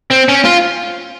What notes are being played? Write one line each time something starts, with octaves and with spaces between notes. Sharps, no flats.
C4
C#4
F4